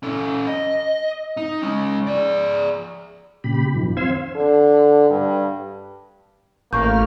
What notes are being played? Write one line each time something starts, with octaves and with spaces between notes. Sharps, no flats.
C#4 A4
D#5
D#4
G#3 C#4
G#4 D5
A#2 C#3 G4 B5
F#2 D#3 F3
C4 F5 C6 E6 G#6
D3
G2
A1 A3 A#3 C#6 F6 G6